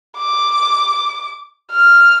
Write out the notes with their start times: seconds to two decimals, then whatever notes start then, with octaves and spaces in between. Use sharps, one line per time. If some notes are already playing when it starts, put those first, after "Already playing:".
0.17 D6
1.72 F6